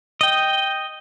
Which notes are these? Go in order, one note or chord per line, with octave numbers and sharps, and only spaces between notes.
D#5 G5